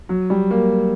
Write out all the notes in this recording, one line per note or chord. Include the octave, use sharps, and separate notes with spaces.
F#3
G3
A#3